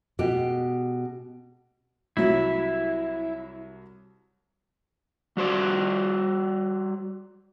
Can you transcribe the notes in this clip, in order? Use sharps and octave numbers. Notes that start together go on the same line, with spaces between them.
B2 G#3 G4
C2 F#3 E4
G3 F#4 C5 D5